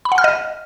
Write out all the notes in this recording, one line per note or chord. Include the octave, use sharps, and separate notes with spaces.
B5
F#5
F6
D#5